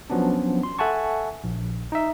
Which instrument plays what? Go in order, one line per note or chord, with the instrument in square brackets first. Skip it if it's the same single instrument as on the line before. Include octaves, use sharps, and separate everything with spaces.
[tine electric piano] F3 F#3 B3 C#4 D4
C6
A4 E5 F#5 G#5 A5 C#6
A#1
D#4 E5